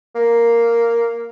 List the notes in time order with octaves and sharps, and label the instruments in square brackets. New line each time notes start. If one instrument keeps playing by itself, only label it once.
[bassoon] A#3